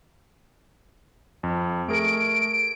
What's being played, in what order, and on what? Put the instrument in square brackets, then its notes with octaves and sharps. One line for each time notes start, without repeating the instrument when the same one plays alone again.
[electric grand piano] F2
[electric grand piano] A3 G#4 A#4 [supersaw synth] D7